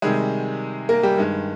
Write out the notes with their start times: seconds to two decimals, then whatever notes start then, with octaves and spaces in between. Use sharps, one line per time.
0.02 C3 D#3 G3 G#3 G#4
0.89 A#3 A#4
1.03 G3 G4
1.18 G2 D#3 G#3